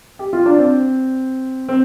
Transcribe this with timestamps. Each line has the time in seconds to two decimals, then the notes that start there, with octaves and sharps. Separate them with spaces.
0.19 G4
0.33 F4
0.46 D4
0.59 C4
1.69 C4